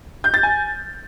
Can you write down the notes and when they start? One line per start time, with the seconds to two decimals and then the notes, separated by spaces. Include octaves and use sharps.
0.24 G6
0.34 A6
0.43 G#5